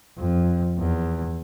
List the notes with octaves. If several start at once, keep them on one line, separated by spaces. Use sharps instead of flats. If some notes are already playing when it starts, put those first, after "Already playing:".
F2
E2